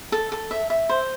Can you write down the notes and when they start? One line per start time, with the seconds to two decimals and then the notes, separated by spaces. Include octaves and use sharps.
0.12 A4
0.32 A4
0.51 E5
0.70 E5
0.89 C5